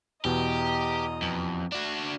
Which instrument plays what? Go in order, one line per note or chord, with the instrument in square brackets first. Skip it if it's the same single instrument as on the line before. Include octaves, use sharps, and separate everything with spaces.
[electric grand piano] E2 B2 [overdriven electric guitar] G4 [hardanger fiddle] D#5 A#5
[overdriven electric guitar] F2
D4 F#4